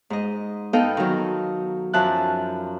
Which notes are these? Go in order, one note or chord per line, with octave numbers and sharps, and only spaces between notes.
G#2 D#5
B3 D#4 A4 D#5 F5 G5
D#3 F#3
F#2 F3 E5 A5 F#6